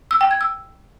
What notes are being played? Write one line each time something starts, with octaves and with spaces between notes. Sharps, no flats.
E6
G5
G#6
E6